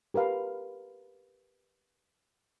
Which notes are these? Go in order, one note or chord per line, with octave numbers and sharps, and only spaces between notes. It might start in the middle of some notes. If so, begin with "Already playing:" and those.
G4 A#4 B4 F5